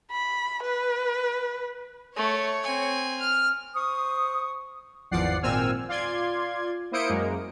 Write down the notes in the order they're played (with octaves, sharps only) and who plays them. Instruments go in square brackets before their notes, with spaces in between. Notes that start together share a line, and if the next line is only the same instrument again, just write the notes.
[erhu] B5
B4
[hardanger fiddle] A3 [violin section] C#5
[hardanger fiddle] C4 G#5
[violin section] F6
[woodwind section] C5 C#6 D#6
[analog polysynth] G#1 E2 F3 D5 F#5 C7
G#1 A#2 C4 G#5 E6 F6
F4 D5 C6 G#6
A#3 E4 C5 D#6 C#7 D7
F#2 G#3 A#3